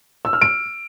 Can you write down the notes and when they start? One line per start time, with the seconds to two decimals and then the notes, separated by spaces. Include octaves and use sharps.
0.25 E6
0.33 F6
0.41 D7